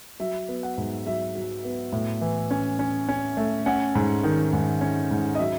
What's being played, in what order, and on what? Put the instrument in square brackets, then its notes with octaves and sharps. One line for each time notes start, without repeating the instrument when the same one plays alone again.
[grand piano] F#3 E5
B3
F#5
G#2
F#3 E5
F#3
B3
A2
E3
C#4
C#4
C#4
A3
C#4 F#5
G#2
D#3
G#2
C#4
G#2
D#5
F#3 E5